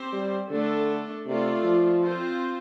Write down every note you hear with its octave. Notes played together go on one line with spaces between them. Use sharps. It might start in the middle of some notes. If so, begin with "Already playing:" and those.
Already playing: C4 G4 C5
G3
D3 A3 D4 A4
C3 A3 F4 D5
F3
C4 F4 C5